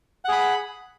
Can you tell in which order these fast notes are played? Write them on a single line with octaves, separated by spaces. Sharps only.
F#5 G#4 B5